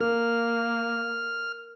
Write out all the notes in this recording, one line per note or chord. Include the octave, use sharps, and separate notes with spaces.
A#3 A#4 F6